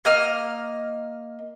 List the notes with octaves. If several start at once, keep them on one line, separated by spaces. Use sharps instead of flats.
A#3 D#5 F6